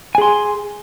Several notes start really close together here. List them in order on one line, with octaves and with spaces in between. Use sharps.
G#5 G#4 C6